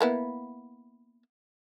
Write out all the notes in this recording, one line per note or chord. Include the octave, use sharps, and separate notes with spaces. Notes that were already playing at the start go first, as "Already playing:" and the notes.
A#3 B3 E4